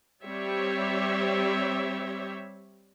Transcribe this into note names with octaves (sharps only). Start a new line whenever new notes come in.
G3 C4 G4 C#5 E5